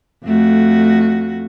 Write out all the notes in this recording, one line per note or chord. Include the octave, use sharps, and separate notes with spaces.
F2 A3 F#4